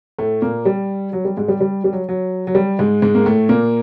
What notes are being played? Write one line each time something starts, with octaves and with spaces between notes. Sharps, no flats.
A2 A3
A#2 A#3
G3
F#3
G3
G#2 G#3
G3
G3
G3
F#3
F#3
F#3
G3
G#2 G#3
G#2 G#3
A#3
A2 A3
A#2 A#3